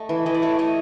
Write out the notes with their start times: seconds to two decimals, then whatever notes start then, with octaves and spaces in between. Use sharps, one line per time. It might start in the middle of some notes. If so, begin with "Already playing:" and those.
Already playing: A3 D#5
0.09 E3
0.26 E3 D#5
0.34 D5
0.42 A3 C#5
0.59 A3 D#5